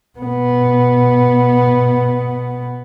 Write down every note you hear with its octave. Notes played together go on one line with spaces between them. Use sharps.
B2 B3